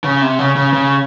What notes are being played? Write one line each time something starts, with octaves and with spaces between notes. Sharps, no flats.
C#3
C3
C#3
C#3
C#3